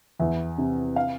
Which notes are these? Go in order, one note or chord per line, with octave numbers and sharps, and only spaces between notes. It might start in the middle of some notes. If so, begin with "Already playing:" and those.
E2 E5
C3
F5